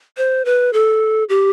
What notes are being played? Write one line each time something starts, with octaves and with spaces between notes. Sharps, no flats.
C5
B4
A4
G4